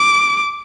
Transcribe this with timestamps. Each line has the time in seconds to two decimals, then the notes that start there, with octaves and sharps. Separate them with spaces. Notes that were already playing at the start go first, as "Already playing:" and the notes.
Already playing: D6